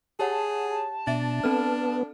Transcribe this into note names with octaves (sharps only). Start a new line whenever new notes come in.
G4 G#4 C#5 F#5 A5
B2 D4 E5 A6
B3 C4 A4 F6